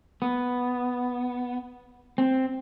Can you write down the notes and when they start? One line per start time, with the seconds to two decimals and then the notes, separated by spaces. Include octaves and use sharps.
0.22 B3
2.18 C4